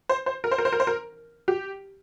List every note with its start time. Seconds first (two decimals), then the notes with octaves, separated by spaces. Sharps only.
0.09 C5
0.26 C5
0.44 A#4
0.51 C5
0.58 A#4
0.65 C5
0.72 A#4
0.80 C5
0.87 A#4
1.48 G4